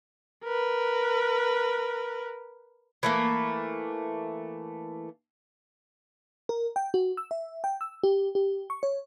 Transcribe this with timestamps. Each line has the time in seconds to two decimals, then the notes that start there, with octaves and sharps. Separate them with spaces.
0.44 A#4 B4
3.03 E3 A3 A#3
6.49 A#4
6.76 G5
6.94 F#4
7.17 E6
7.31 E5
7.64 G5
7.81 E6
8.03 G4
8.35 G4
8.70 C#6
8.83 C#5